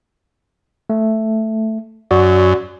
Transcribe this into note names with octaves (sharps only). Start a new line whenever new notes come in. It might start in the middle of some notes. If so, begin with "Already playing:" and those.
A3
F#2 F#4 D5